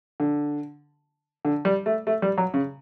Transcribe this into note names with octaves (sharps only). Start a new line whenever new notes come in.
D3
D3
G3
A3
A3
G3
F#3
C#3